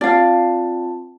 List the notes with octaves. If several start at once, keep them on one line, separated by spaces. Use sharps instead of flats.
C4 F4 D5 F5 A5